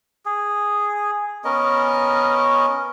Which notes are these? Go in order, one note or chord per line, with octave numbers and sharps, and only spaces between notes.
G#4
B3 C#4 A#4 D#5